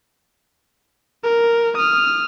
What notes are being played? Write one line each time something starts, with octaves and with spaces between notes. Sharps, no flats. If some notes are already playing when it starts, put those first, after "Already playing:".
A#4
D#6 F6